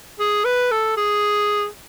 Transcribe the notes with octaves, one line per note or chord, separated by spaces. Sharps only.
G#4
B4
A4
G#4